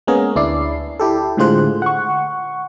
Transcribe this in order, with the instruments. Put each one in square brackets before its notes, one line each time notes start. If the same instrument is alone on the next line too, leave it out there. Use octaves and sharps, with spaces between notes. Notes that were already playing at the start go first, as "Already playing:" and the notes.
[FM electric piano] G#3 A#3 B3 C#4 G#4 A#4
D2 D4 E4 D5 C7
E4 G4 A4
A2 D3 G#3 F4 C5 F#6
F#5 C#6